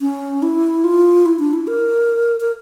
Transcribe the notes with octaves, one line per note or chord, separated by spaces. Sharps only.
C#4
E4
F4
E4
D4
E4
A#4
A#4